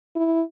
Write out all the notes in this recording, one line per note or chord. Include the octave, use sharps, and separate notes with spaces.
E4